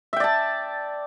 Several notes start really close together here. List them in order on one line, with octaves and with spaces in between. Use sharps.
E5 G5 D5 A5